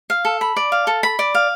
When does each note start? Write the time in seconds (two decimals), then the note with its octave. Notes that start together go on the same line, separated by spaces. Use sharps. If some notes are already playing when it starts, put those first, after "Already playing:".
0.10 F5
0.25 A4
0.41 B5
0.56 D5
0.72 F5
0.87 A4
1.03 B5
1.19 D5
1.34 F5